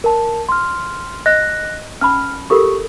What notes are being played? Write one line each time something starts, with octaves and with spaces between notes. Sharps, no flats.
A#4 A5
C6 F6
D#5 F#6 A#6
C#4 A5 B5 F6
F4 G4 A4 A#4 C#6